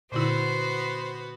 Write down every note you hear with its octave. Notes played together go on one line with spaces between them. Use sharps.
A#2 D3 B3 E4 F#4 B4 C5